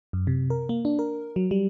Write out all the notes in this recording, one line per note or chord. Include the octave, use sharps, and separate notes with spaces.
F#2
C3
A#4
A#3
D4
A#4
F#3
G3